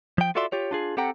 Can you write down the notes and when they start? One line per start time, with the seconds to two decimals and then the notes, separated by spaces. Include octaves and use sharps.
0.18 F3 G5
0.35 F4 F#4 A4 D5 E5 C6
0.52 F4 G4 C#5
0.71 D4 F4 G#4
0.97 C4 G4 A4 F#5 G5 A#5